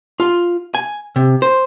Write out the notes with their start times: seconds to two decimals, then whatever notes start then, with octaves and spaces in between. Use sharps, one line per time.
0.20 F4
0.75 G#5
1.16 C3
1.42 C5